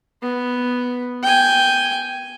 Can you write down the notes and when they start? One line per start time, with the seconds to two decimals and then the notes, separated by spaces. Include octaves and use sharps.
0.22 B3
1.23 G5 G#5